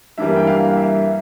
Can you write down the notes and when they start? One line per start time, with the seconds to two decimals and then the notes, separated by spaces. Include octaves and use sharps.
0.18 G2 E3 G3 A#3 E5
0.36 G5
0.47 F5
0.77 E5